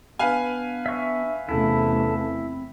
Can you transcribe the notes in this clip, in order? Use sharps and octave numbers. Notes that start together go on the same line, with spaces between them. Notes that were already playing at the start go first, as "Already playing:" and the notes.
B3 D4 B4 F5 G#5
E5 C#6
E2 C3 A3 C#4 E4 A4 A5
C4